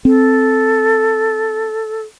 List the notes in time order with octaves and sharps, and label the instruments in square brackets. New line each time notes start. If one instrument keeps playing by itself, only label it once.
[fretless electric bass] C4 [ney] A4